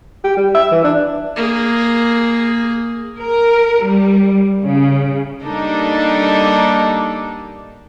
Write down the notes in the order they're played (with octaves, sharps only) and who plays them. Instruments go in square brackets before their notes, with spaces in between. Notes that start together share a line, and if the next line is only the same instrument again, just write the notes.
[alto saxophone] G4
G3
E5
E3
D4
[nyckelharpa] A#3 G#4
[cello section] A#4
G3
C#3
[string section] G3 A#3 D4 D#4 A4